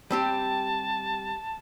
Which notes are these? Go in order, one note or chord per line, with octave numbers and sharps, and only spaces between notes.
G3 C4 G4 A5